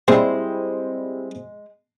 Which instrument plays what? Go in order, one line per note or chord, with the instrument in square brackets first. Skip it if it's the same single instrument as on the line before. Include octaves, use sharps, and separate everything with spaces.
[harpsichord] A#2 G#4 [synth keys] G3 C4 E4 [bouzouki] G#3 [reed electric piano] C5